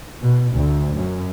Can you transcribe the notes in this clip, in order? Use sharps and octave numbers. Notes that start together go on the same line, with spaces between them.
B2
D2
F#2